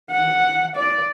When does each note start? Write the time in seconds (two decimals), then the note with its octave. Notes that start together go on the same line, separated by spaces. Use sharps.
0.11 F#5
0.76 D5